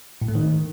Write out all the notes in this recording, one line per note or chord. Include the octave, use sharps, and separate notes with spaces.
A2
A3
D#3